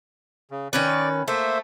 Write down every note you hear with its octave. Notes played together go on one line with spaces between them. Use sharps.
C#3
D#3 C#4 B4 D5
A3 A#3 C5 E5